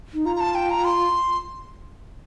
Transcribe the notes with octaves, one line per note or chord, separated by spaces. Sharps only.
D#4
F4 A#5
A#5
A5
G5
A#5
C6